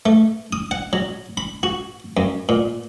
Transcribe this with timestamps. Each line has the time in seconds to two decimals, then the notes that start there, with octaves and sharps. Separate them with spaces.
0.06 A3
0.53 D#6
0.71 F#5
0.93 F#3
1.37 B5
1.63 F#4
2.17 F#2
2.49 A#2